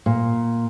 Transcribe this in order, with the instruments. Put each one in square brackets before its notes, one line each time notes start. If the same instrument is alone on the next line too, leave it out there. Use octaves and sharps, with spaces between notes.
[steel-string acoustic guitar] A#2